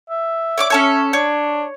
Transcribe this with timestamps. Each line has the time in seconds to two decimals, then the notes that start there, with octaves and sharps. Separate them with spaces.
0.10 E5
0.58 C#5 D5 D6
0.70 C#4 A4 C#5
1.13 D4 C#5